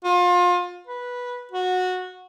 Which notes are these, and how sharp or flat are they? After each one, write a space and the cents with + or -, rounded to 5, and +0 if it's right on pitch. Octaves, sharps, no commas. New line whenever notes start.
F4 +30
B4 -10
F#4 -15